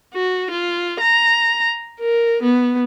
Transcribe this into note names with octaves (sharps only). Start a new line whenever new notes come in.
F#4
F4
A#5
A#4
B3